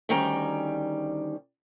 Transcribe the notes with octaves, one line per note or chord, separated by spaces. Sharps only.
D2 D#3 G3 C#4 G5 A#5